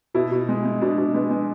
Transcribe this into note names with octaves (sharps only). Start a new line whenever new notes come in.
B2 E4
B2
G#3
G#3
B2 D4
B2
G#3 B3
G#3